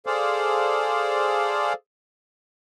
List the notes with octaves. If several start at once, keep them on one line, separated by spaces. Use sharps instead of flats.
G#4 A4 C5 D5 F5